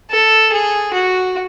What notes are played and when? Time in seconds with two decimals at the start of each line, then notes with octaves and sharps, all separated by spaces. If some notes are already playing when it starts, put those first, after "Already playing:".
0.10 A4
0.52 G#4
0.93 F#4